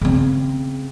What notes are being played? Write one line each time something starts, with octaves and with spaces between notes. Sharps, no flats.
C#3 C4